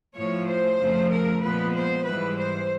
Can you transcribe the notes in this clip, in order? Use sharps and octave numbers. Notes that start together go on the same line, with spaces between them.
A2 F3 A3 C#5
C5
F2 C#3 F3 A3
A#4
A#2 F3 G#3 B3 B4
C5
G#2 E3 G3 B4
C5